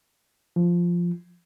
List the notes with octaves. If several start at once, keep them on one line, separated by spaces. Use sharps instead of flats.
F3